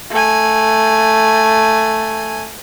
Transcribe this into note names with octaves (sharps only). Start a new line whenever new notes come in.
A3 G#5